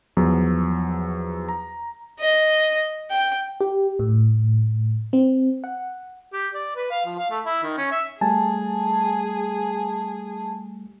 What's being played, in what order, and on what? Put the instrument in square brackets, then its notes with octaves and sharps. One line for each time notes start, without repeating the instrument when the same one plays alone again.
[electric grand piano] E2 F3 F#3
A#5
[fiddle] D#5
G5
[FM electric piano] G4
A2
C4
F#5
[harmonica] G4
D5
B4
F5
F3
F5
A3
E4
D#3
C#4
E5
[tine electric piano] G3 A3 [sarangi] G#4 [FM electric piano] G#5 A5